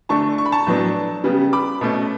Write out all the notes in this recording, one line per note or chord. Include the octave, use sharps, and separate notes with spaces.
D3 A3 D4 A5 C#6
C#6
B5
A5 C#6
A2 F#3 B3 D4
C#3 G3 B3
B5 D6
B2 A3 C#4